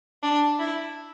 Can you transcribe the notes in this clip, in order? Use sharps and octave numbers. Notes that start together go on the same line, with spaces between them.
D4
E4